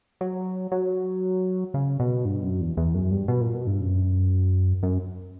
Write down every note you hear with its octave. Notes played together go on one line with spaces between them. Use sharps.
F#3
F#3
C#3
B2
G2
F#2
E2
E2
F#2
G2
B2
A#2
B2
G2
F#2
F#2